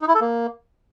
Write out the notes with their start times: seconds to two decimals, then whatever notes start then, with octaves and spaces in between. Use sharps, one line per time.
0.02 D#4
0.08 E4
0.15 A4
0.21 A#3